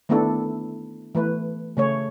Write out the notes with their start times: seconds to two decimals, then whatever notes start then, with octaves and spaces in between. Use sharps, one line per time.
0.09 D#3 A3 B3 D4 E4 A4
1.15 E3 A3 B4
1.77 C#3 A3 C#5